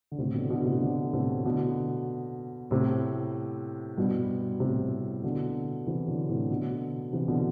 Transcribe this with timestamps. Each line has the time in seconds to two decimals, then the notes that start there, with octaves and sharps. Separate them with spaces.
0.12 D3
0.18 A2 C3
0.34 B2 D3
0.50 B2 D3
0.66 A2 C3
0.81 B2 D3
1.13 A2 C3
1.45 B2 D3
2.71 A2 C3
3.98 G2 B2
4.60 A2 C3
5.24 B2 D3
5.87 C3 E3
6.07 D3 F#3
6.29 A2 C3
6.50 B2 D3
7.13 C3 E3
7.28 B2 D3